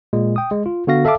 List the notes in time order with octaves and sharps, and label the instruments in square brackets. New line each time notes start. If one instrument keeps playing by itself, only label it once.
[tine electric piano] A#2 G#3
G5 D#6
G#3
F4
D3 B3 F#4 F5 A#6
A4 E5 F5 A5 D6